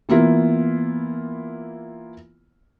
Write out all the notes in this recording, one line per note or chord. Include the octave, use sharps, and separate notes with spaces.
E3 A#3 B3 E4 F4